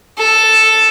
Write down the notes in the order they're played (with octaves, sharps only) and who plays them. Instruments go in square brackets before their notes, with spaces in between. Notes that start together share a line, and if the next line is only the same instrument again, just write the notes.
[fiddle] A4